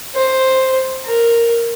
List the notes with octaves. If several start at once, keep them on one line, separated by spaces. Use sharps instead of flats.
C5
A#4